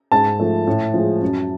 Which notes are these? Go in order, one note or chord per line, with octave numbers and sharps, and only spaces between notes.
G#2 A5
F3 A3
A2
F3 G#3
F#2